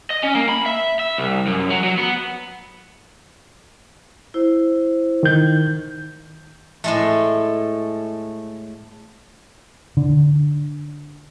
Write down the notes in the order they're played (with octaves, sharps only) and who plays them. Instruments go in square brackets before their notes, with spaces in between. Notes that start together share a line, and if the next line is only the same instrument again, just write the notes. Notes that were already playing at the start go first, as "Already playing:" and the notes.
[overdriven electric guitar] D#5
C#4
A#3
B5
E5
E5
C2
F#2
F#3
F#3
B3
[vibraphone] E4 C5
[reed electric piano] D#3 G6
[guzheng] A2 G#3 A3
[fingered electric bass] D3